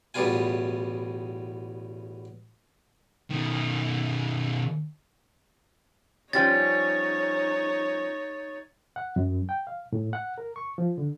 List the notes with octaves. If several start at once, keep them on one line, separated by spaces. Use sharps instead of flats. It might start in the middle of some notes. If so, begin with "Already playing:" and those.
A1 E2 B2 G3 F4 G#5
B2 D#3
F3 G3 C#4 D#4 C#5 A6
F#5
F#2
G5
F5
A2
F#5
A#4
C#6
F3
D3